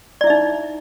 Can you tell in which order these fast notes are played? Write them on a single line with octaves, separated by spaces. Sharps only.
D5 E4 E5 D#4